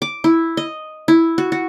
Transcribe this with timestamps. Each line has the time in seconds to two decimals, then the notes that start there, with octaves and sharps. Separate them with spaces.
0.02 D6
0.24 E4
0.57 D#5
1.08 E4
1.38 F#4
1.52 F#4